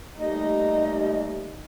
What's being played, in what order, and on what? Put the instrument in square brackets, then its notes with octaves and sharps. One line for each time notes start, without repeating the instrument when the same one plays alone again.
[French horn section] D#2 G3 A3 [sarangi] D#4 [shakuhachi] D#5